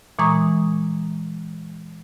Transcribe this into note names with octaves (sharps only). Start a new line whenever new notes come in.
A#2 E3 G#3 A#5 C#6 D#6